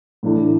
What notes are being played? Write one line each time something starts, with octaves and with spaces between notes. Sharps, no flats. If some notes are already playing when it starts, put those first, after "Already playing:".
A2 E3 A3 D4